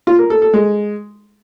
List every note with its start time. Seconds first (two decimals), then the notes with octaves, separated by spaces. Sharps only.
0.07 F4
0.19 A#4
0.30 A4
0.42 A4
0.54 G#3